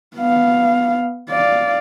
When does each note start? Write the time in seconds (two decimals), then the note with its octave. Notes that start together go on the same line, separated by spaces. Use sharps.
0.17 B3 F5
1.31 D5 F5